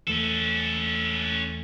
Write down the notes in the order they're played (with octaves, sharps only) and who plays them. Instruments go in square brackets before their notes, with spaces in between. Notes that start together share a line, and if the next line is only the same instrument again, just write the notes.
[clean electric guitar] E2 A3 [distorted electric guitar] C#4 A4